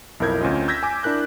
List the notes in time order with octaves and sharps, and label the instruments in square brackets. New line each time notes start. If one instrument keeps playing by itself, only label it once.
[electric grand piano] B1 F2 E4 A#4 G6 G#6
D2 C4 C#4 F4 D#5
E6 G6 G#6 A#6 B6
G#5 D6
D4 E4 A#4 F#6 G6